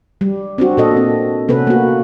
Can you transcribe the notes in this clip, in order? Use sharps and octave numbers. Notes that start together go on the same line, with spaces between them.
G3
C4 D4 F#4
A#2 A4 D#5
C4
C3 B3 C#4 A4 B4
A#3 F#4